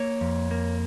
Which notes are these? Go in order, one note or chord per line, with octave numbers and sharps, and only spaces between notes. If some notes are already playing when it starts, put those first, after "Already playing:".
Already playing: A#3 C#5
F2
A#3